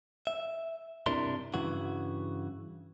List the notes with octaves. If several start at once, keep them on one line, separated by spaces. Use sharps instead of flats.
E5
G2 C3 D4 E4 A#4 C6
G2 C#3 E3 F#4